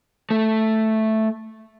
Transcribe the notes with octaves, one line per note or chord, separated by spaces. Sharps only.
A3